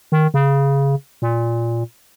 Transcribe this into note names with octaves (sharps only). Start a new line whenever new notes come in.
D#3
C#3
A#2